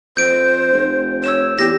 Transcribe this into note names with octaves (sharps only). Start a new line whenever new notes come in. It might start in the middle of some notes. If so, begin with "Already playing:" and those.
F2 C5 G6 D7
F1
C#5 E6 E7
E2 G4 A#6